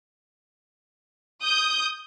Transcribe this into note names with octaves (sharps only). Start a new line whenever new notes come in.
D#6 G6